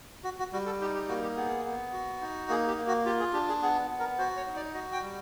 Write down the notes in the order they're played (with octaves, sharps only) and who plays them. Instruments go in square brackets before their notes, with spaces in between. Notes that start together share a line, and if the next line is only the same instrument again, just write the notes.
[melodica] F#4
F#4
G3 F#4
A4
D#4 G4
G4
A#3 F#4
G4
B3 G#4
B3
F#4
D#4
A#3 G#4
G4
A#3
F#4
F4 G4
G#4
D4 G4
G#4
B3 G#4
B3
A#4
F#4 C5
C#5
D#4
D5
F#4 D#5
G5
G3